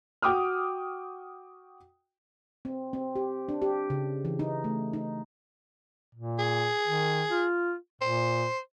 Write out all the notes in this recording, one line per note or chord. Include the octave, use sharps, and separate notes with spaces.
F#4 G5 D6 D#6 F6
C4
C4
G4
D4
G4
C#3
E3
D#4
A3
D#4
A#2
G#4
D#3
F4
A#2 C5